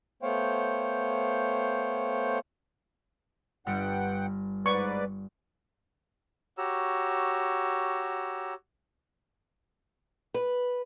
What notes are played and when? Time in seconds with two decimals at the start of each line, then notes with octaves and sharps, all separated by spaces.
0.23 A3 B3 C5 C#5 F5 G5
3.66 G1 G2 G3 F#5 G5 C#7
4.66 G#2 B4 D5 C#6
6.58 F#4 G4 C#5 A#5 E6
10.34 B4